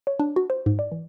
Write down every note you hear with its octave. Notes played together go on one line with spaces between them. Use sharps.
C#5
D4
F#4
C5
G#2
D5
E3